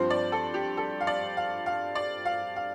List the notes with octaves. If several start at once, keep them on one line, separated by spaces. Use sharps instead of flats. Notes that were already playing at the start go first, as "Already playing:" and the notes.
Already playing: G2 F3 C4 C5
D5
A4
G4
A4
F5
D5
F5
F5
D5
F5
F5